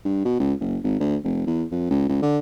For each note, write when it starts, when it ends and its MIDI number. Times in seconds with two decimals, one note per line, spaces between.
0.05 0.24 43
0.25 0.35 47
0.40 0.54 37
0.60 0.78 30
0.83 0.99 32
1.00 1.16 38
1.24 1.46 29
1.47 1.64 40
1.71 1.88 41
1.90 2.04 37
2.09 2.19 37
2.22 2.38 50